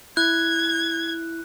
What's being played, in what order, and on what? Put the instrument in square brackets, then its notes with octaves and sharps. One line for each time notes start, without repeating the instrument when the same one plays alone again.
[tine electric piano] E4 [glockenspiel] F#6 [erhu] G#6